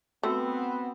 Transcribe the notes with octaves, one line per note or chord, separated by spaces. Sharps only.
A3 B3 C4 F#4 G5 E6